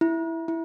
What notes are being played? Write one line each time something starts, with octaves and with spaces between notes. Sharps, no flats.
E4
E4